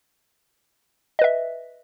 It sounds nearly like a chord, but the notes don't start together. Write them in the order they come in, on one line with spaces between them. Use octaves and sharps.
D#5 B4 E5